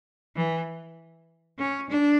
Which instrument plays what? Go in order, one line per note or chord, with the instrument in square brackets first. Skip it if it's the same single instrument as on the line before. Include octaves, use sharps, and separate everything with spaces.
[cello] E3
C#4
D4